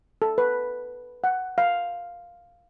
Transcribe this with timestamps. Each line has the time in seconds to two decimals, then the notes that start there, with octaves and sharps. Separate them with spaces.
0.22 A4
0.38 B4
1.24 F#5
1.58 F5